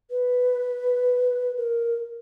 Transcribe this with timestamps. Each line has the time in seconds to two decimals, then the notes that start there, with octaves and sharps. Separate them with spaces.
0.11 B4
1.58 A#4